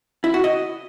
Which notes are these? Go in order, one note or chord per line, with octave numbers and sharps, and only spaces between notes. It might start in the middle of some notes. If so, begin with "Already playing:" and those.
E4
F#4
D#5